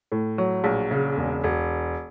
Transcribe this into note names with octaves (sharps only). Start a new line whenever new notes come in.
A2
F#3
A#1
C#3
E1
E1